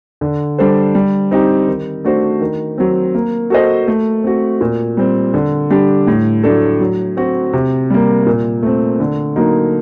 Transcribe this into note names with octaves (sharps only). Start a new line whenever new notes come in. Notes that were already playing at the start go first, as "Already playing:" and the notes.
D3
G3 D4 A4 C5
G3
C4 D#4 G4
D#3
A3 D4 F#4 C5
D#3
F#3 C4
A#3
F#4 A4 C5 D#5
A3
C4 F#4
A#2
G3 C4
D3
G3 D4 G4
A2
F#3 A3 D4 A4
F#3
C4 F#4
C3
G3 A#3
A#2
A3 C4
D3
F#3 A#3 D#4